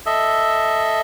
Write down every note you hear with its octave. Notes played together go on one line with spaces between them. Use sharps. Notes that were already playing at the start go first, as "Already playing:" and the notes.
A4 D#5 E5